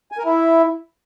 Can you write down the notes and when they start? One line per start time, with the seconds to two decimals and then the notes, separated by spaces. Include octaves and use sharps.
0.12 G#5
0.18 A#4
0.25 E4